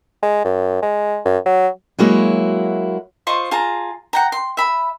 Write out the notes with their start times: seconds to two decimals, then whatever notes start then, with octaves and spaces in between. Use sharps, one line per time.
0.23 G#3
0.45 F#2
0.82 G#3
1.25 F#2
1.46 F#3
1.99 F#3 G#3 A#3 E4 F#4 C#5
3.27 F4 C5 D#5 C#6
3.51 F4 G#4 A5 A#5
4.13 F#5 G5 A#5
4.32 C6
4.57 E5 B5